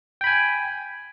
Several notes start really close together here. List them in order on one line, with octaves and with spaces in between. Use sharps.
G5 B5 G#5